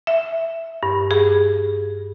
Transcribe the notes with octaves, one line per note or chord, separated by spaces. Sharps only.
E5
G2
G#4